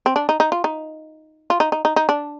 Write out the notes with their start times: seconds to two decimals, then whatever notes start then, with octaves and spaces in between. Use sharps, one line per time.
0.06 C4
0.16 D4
0.29 D#4
0.40 D#4
0.52 F4
0.64 D#4
1.50 F4
1.60 D#4
1.72 D#4
1.85 D#4
1.96 D#4
2.09 D4